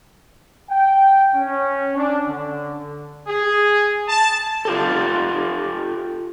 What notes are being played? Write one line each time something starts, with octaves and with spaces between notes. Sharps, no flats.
G5
C#4
D4
D3
G#4
A5
F4 G4 A4